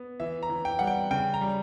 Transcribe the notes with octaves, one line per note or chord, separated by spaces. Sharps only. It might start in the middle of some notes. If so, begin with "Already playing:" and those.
Already playing: B3
E3 E5
A#5
E3
G5
G3 F#5
G5
C#3 G5
A#5
G3